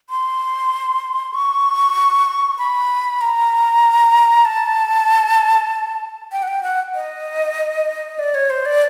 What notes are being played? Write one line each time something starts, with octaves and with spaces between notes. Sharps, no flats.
C6
C#6
B5
A#5
A5
G5
F#5
G5
F#5
D#5
D5
C#5
C5
D5